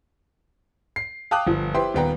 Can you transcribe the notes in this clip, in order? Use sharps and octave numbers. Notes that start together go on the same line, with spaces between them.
C7
F5 G5 A5 D6 D#6 F#6
G1 F3
E4 G4 B4 C5 G5 C6
D#1 D#2 B3 G5 A#5